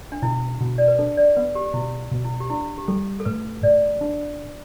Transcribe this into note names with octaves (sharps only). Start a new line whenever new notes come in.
D4
B2 E4
B2
D5
B4
D4 A4
D5
B3 B4
G4
B2 E4
B2
E4
G4
D4 E4
G4
G3 A4
A4
A2 B4
A2 D5
D4